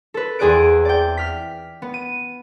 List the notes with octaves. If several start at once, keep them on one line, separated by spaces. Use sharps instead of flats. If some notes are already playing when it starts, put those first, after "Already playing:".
A4 B4
E2 C4 G#4 D5 F#6 D7
D5 G5
F6 B6
B3
D#7